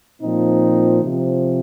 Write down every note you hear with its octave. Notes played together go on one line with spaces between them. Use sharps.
A#2 F3 C4 D#4
C3 F3